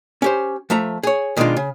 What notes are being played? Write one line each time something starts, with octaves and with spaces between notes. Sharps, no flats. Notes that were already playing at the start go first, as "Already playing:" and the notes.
C#4 G4 C5
F3 A3 E5 A#5
G#4 C#5
B2 D#3 G#3 C#4 D4 F4
C#3